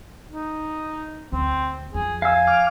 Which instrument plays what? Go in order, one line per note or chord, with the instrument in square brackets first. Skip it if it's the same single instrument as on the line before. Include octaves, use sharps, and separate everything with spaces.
[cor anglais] D#4
[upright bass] D2 [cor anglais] C4
[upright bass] F2 [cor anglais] G#4
[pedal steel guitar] F5 E6 [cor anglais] G#5
[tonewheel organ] D6 F6